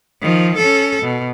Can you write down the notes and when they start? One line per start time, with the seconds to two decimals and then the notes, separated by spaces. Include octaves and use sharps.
0.22 D#3 F3
0.58 C#4 A4
1.02 B2